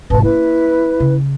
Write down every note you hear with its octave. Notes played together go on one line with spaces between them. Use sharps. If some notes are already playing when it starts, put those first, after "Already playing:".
G#1 C3 B4 A5
A#3 C#4 E4 B4
C#3